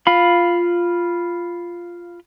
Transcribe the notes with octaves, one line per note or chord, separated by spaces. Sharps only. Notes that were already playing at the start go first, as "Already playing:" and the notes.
F4 F5 B5